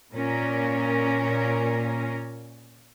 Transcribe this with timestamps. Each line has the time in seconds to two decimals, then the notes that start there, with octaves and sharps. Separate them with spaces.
0.13 A#2 C#4 A#4